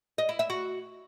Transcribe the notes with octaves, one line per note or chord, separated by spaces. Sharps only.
D#5
E4
E5
F#4